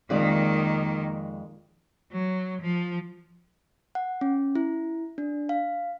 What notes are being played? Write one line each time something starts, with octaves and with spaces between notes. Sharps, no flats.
F2 D#3 G#3 A#3 D5
F#3
F3
F#5
C#4
E4
D4
F5